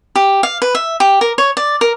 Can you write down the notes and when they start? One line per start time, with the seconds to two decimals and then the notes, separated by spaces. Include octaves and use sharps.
0.16 G4
0.43 F5
0.62 B4
0.75 E5
1.00 G4
1.21 A#4
1.38 C#5
1.57 D5
1.81 A#4